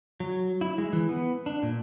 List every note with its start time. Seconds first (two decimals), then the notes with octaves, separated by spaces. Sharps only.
0.20 F#3
0.61 E4
0.78 G#3
0.93 E3
1.09 B3
1.46 D4
1.63 A#2